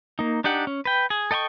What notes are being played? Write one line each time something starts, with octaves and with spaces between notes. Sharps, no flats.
A#3 D#4
D4 D#4 G4 F#5
C#4
B4 G5
G#4
A4 D#5 G5 A#5 C#6